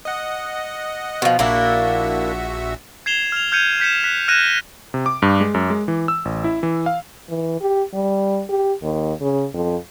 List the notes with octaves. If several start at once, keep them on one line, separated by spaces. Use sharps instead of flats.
D#5 F#5
B2 F3
A#1 A#3 D4 E4 F#4 E5
G#6 C7 E7 F7 G7
F6 F7
F6 G6 G#6 C#7 D#7 F7
G6 B6 C#7 E7
F#6 G#6 B6
F6 F#6 G#6 A#6 D#7 E7
C3
D6
G2
G#3
F#2
G#3
E3
E6
A1
E4
E3
F5
E3
G4
G3
G4
D#2
C#3
F2